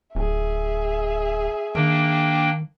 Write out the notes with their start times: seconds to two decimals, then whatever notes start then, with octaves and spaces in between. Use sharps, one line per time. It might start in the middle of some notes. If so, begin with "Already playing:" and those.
0.15 D1 G#4 E5
1.75 D#3 A#3 D4 G5